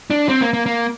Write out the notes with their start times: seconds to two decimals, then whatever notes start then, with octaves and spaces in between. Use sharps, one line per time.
0.10 D4
0.29 C4
0.41 A#3
0.53 A#3
0.66 A#3